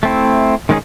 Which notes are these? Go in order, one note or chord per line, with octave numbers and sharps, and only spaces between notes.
A3 C4 E4
D#3 G#3 C#4 D#4 G#4